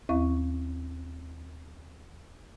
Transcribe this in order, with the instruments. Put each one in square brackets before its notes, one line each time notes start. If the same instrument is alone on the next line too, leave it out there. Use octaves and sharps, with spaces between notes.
[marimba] D#2 C4 E4 F5 C#6